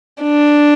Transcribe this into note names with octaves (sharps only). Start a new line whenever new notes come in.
D4